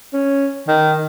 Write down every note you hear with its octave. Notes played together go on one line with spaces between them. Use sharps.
C#4
D#3